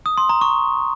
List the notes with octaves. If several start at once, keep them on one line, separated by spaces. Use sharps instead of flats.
D#6
C6
A#5
C#6